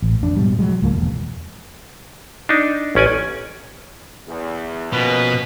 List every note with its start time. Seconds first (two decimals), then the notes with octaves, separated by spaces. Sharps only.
0.02 A1
0.22 F2 D4
0.36 G#2 B2 G3
0.59 F3 F#3 G#3
0.82 C#2 G#2 F3 A#3
0.94 E1
2.49 D4 D#4
2.95 A1 C#4 D5 G#5
4.28 E2
4.93 B2 F3 A#3 C#4 B4